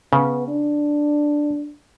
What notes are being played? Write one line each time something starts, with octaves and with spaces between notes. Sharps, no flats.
C#3 B3
D4